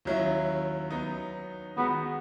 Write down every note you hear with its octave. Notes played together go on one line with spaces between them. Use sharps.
D#2 D#3 F#3 C#4 E4
F#3 B3 D#4
D#3 G#3 B3 D#4 F#4